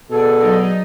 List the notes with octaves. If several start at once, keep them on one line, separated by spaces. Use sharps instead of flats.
B2 G#4 A4 D5
F#3 D#4 D#5